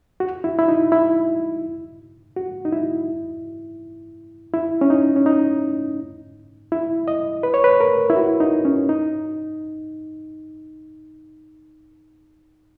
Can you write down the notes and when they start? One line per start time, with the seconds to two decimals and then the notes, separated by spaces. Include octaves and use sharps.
0.20 F#4
0.44 E4
0.59 E4
0.68 D#4
0.92 E4
2.36 F#4
2.65 D#4
2.73 E4
4.54 E4
4.81 C#4
4.90 D#4
5.16 C#4
5.26 D#4
6.72 E4
7.08 D#5
7.43 B4
7.54 C#5
7.64 B4
7.81 A#4
8.10 E4
8.16 F#4
8.40 D#4
8.65 C#4
8.89 D#4